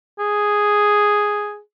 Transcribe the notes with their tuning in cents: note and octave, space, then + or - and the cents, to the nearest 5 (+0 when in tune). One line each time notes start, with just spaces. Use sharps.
G#4 +0